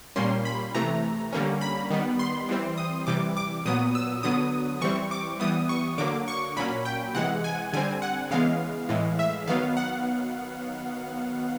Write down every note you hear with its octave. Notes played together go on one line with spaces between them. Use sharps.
A#2 G3 A#3 C#4 C6
B5
C3 E3 A3 A#5
D3 G3 A#3 C#4
B5
D#3 G3 B3
C6
E3 G3 C4
D#6
C3 E3 G3 D6
D6
A#2 F#3 B3 D#6
E6
D3 F#3 B3 D#6
E3 G3 C4 C#6
D6
E3 G3 B3 D#6
C#6
D3 F#3 A#3 D6
C#6
A#2 F#3 A#3 C#4 B5
G5
C3 E3 G#3 F#5
G#5
D3 G3 C4 G#5
F#5
C#3 E3 G#3 B3 F5
A2 E3 G#3
E5
D#3 F#3 B3 F5
F#5